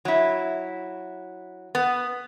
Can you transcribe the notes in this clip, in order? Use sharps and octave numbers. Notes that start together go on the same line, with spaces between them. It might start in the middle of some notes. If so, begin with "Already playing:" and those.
F#3 E4
B3